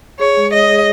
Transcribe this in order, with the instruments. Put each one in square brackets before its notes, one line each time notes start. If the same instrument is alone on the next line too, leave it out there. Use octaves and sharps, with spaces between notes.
[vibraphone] G#4 [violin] C#5
[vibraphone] G#3
[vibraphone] C#5 [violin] D#5
[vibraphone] G#4